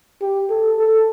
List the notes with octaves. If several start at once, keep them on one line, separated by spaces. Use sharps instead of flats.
G4
A4
A4